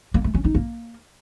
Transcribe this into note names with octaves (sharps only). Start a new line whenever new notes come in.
A#3
A3
C#4
D#4
A#3